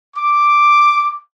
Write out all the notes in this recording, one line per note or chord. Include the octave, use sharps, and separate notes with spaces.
D6